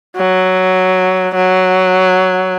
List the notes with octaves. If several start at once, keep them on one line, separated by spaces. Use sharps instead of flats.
F#3
F#3